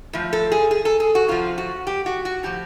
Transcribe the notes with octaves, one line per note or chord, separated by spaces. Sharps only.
A2 F3
A4
G#4
G#4
A4
G#4
F#4
C3 F3 F4
F#4
G4
F#4
F#4
A2 F3 G4